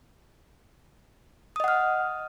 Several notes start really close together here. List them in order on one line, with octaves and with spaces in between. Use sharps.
D#6 D#5 F#5 F6